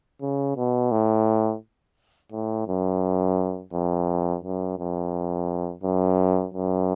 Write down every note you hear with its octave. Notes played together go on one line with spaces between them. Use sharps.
C#3
B2
A2
A2
F#2
F2
F#2
F2
F#2
F#2